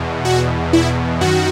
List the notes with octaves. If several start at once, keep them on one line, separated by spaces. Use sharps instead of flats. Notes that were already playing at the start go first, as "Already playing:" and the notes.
Already playing: E2 B2
F#4
E4
F#2 D#3 F#4